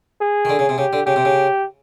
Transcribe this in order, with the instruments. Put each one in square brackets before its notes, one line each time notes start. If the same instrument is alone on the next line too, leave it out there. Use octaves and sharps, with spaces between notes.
[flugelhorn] G#4
[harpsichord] D#3
D3
C#3
C3
[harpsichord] C#3 [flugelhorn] G4
[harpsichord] D3
[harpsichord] C#3 [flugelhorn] G4
[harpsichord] C3
C#3